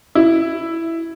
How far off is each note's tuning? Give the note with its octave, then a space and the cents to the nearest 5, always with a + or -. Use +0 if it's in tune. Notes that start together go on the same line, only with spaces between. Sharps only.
E4 +5